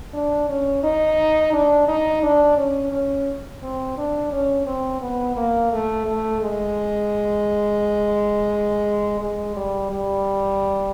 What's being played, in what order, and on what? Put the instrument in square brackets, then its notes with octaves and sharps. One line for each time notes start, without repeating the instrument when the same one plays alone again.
[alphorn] D4
C#4
D#4
D4
D#4
D4
C#4
C#4
C4
D4
C#4
C4
B3
A#3
A3
A3
G#3
G#3
G3
G3